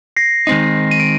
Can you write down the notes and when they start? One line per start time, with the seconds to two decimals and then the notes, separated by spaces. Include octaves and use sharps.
0.17 A#6 C7
0.47 D#3 G#3 C4 D#4
0.91 D#7
1.00 D7